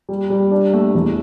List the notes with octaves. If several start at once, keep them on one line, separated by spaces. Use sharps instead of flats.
G3
G3
D4
A3
E2